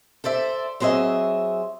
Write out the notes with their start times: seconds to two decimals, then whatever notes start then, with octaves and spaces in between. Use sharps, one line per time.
0.24 A4 C5 D5 E5
0.80 F#3 C4 G#4 D#5 E5